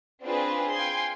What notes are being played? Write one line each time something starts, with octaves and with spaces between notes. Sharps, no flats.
C4 D4 F4 G#4 B4
F5 G5 G#5 C6